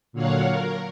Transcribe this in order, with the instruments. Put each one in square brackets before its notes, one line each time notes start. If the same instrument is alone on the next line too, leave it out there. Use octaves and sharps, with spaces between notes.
[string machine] A#2 D3 F#3 C#5 F5 F#5
A#4